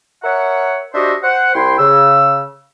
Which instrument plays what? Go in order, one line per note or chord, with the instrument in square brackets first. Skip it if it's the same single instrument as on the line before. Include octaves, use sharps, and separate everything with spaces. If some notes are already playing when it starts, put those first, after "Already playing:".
[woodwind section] A#4 C#5 E5 F#5
D4 F#4 G4 C5 D#5 E5
C5 F#5
C2 E4 G5 C6
C#3 E6